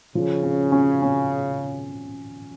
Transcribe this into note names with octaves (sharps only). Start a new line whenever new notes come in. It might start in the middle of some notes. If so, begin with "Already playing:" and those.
C#3 F3
C#4
C#4
C#4